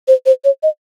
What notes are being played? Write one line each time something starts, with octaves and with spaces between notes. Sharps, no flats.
C5
C5
C#5
D#5